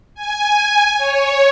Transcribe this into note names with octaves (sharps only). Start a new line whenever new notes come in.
G#5
C#5